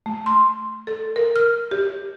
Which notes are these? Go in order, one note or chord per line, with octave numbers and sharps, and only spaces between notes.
A3
C6
A4
A#4
F6
G4